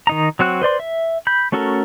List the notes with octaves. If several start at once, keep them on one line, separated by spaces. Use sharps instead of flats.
D#3 D#4 A#5
F#3 C4 F#4 F#6
B4 C5 D5 C6
E5
B5 G6
A3 C#4 F#4 A4 A#4